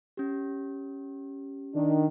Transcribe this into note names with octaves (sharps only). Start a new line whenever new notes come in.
C#4 G4
D#3 D4